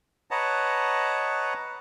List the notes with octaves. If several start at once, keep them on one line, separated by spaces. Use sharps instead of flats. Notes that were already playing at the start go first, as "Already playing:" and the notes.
B4 C#5 D#5 F#5 A5 A#5